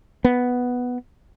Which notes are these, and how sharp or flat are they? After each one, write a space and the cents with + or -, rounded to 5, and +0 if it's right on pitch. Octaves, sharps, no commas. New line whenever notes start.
B3 +0